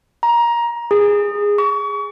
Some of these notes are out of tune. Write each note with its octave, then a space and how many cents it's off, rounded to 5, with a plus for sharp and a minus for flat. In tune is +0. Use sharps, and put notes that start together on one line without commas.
A#5 +20
G#4 -15
C#6 +35